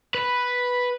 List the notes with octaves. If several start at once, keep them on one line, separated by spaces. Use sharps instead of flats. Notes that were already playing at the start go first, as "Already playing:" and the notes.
B4